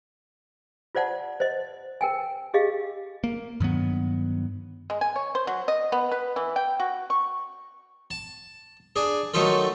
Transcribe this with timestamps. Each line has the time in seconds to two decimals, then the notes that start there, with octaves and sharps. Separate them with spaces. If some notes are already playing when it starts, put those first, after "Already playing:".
0.95 F4 C5 D5 F#5 A5
1.40 C5 D#5
2.01 A#4 G5 G#5
2.54 G4 G#4 D#5 F5
3.24 A#3
3.60 G2 D#3 F#3 B3
4.90 G#3
5.01 G#5
5.16 C#5
5.35 C5
5.47 F#3
5.68 D#5
5.92 B3
6.12 B4
6.36 E3
6.56 G5
6.80 F#4
7.10 C#6
8.11 A5
8.96 D4 G#4
9.34 D#3 F#3 A3 D#4 F4 A4